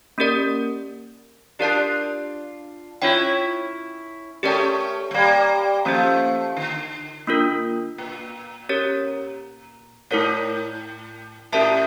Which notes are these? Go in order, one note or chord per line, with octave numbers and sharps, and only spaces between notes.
A#3 C#4 G4 A#4 D5
D4 F4 G4 A#4 D5 A5
C#4 E4 F4 C#5 G5
A3 C#4 G4 A#4 D5 G5
A3
G3 A#3
F3 A3 A#3 C#4 G4
D3
A#3 D4 F4 A#4
A#2
C#4 G4 A#4 C#5
A2 A3 E4 A#4 C#5
A2 C#4 G4 A#4 E5 A5